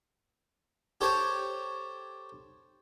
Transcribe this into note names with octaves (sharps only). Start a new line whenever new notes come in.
G4 A4 C5 C#5